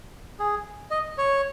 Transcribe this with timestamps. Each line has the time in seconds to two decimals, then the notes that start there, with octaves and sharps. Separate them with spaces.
0.39 G#4
0.91 D#5
1.18 C#5